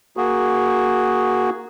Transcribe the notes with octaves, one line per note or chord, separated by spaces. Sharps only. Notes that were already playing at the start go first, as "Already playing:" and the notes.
A#3 F#4 G#4